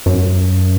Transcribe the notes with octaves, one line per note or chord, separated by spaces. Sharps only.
F#2